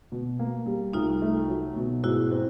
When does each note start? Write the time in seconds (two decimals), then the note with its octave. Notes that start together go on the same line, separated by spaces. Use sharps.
0.12 B2
0.39 A#3
0.66 G3
0.93 C2 D#4 F4
1.22 A3
1.48 F#3
1.76 B2
2.03 G#2 E4 F#4
2.31 C4